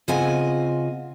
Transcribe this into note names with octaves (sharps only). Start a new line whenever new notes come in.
C#3 C4 F4 D#5 F#5 G#5